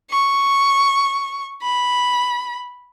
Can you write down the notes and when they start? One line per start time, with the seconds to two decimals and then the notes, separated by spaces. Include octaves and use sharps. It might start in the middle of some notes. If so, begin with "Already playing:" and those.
0.11 C#6
1.62 B5